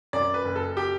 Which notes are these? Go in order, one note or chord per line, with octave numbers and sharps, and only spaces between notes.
F#2 D5
B4
F#1
A4
G4